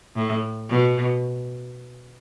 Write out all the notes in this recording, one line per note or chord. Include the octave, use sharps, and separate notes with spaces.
A2
B2